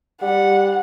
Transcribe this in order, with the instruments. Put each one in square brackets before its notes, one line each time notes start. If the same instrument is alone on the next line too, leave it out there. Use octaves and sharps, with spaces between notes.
[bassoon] G3 [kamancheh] F#5